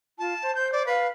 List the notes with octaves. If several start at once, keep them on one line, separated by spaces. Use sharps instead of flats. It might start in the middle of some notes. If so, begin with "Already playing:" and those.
F4 A5
C5
C5 G6
D5
B4 F5